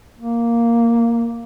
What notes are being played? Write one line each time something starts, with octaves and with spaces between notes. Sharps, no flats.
A#3